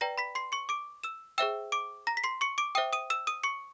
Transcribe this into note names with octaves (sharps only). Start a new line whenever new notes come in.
B4 D5 G5 A#5 A#6
B5 B6
C6 C7
C#6 C#7
D6 D7
E6 E7
G#4 C5 E5 G5 E6 E7
D6 D7
A#5 A#6
B6
C6 C7
C#6 C#7
D6 D7
C5 E5 G5 D#6 D#7
D#6 D#7
E6 E7
D#6 D#7
C#6 C#7